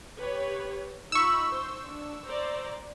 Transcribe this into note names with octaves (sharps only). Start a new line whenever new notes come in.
G4 B4 C#5
D#4 F4 B5 C#6 E6
C5
D4
C5 D5 A#5